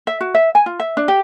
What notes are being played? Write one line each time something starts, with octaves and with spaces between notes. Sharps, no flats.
E5
F#4
E5
G#5
F4
E5
D4
G4